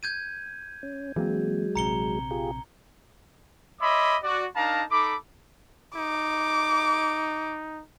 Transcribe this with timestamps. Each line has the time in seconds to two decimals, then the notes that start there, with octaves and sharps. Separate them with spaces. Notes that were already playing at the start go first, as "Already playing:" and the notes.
0.03 G6 G#6 D#7
0.83 C#4
1.16 E3 F#3 G#3 A#3 C4
1.75 A#1 C3 A#5 C#7 G7
2.31 F4 G4 G#4
3.81 C#5 D#5 E5 B5 C6 D6
4.23 F#4 D5
4.56 D4 D#4 A#4 F5 A5 A#5
4.90 D#4 A4 B5 D6
5.96 D#4 D6